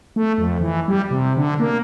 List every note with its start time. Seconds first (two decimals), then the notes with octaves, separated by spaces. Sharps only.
0.16 A3
0.38 F2
0.61 E3
0.88 G3
1.11 C3
1.37 D3
1.60 A#3